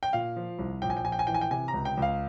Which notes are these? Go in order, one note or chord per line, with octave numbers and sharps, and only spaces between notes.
G5
A#2 F5
F3
C2
A#1 G5
G#5
G5
A#1 G#5
G5
G#5
E3 G5
G#5
G5
C3 G#5
A#5
C#2
G5
C#2
F5